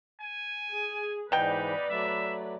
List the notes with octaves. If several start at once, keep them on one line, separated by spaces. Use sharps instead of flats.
G#5
G#4
G#2 B2 E3 D#4 B4 D5 G5 B5
F#3 A3 E5